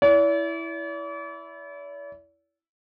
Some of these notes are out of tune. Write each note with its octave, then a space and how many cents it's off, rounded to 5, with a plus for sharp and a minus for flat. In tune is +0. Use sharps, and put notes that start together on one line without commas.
E4 +0 D5 -45